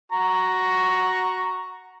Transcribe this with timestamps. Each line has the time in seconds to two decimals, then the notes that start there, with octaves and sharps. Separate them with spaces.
0.12 F#4 A#5 C#6